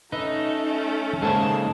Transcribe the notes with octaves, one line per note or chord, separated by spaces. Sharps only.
A3 C#4 D#4 B4 D#5 E5
G#2 C#3 G#3 A#3 A5